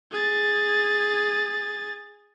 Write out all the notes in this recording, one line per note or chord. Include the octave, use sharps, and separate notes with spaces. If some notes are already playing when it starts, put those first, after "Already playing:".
G#4 A6